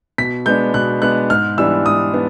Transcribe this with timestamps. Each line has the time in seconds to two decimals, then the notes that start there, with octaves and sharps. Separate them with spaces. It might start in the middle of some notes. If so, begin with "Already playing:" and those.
0.18 B2 B6
0.46 G#3 B3 D4 G6
0.74 B2 F#6
1.02 G#3 B3 D4 F#6
1.30 G#2 F6
1.58 E3 G3 B3 D4 E6
1.86 G#2 D#6
2.14 B3 D4